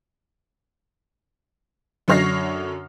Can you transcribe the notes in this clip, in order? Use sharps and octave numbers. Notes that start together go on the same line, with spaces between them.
F#2 D3 C#5 F6 A#6 C7